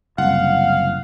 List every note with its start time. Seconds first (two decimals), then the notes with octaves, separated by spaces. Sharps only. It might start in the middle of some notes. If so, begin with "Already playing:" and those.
0.18 F#1 C2 F5 F#5